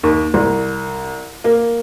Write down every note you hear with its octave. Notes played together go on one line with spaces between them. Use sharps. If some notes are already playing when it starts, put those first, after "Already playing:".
D#2
C2
A#3